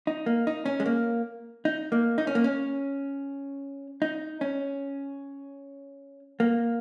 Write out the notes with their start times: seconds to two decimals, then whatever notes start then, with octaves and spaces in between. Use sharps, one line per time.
0.07 D#4
0.26 A#3
0.47 D#4
0.66 C#4
0.80 G#3
0.86 A#3
1.65 D#4
1.92 A#3
2.18 D#4
2.27 C#4
2.35 A#3
2.44 C#4
4.02 D#4
4.41 C#4
6.40 A#3